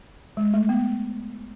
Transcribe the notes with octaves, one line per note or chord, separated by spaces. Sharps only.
G#3
A3
B3